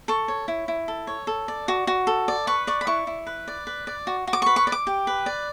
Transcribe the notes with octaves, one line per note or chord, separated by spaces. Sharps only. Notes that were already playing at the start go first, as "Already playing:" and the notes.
A4 C#6
C#5
E4
E4
A4
C#5
A4
D5
F#4
F#4
A4
D5
B4 C#6
D5 C#6
B5
E4 C#6
E4
B4
D5
B4
D5
F#4
F#4
D6
B4 C#6
C#6
D5
D6
G4
B4
D5